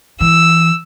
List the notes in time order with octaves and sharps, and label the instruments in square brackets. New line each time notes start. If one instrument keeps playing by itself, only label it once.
[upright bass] E3 [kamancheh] E6